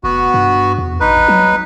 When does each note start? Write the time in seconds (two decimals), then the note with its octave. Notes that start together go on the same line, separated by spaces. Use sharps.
0.04 F1 B3 F#4
0.34 G2
0.78 E2
1.00 A#1 D#4 B4
1.28 F#3